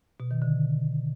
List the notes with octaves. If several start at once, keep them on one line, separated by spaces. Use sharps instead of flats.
B2
D#3
D3